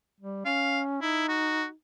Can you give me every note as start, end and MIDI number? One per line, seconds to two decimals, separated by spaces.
0.21 0.43 55
0.45 1.01 61
0.45 0.80 77
1.01 1.71 63
1.01 1.27 64
1.28 1.65 66